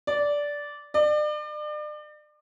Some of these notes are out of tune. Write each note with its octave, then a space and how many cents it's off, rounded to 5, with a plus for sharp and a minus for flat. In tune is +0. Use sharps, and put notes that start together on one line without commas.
D5 -10
D5 +40